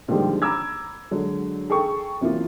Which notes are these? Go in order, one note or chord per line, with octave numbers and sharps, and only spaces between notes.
A#2 D3 D#3 F3 G3 G#3
A#5 B5 D6 E6 G#6
D3 F#3 G#3
G#4 A4 G5 C#6
F#2 C3 E3 A#3 F4